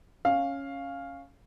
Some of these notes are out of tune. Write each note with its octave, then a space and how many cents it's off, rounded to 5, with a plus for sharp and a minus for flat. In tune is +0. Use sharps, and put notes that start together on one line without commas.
C#4 -5 F5 +0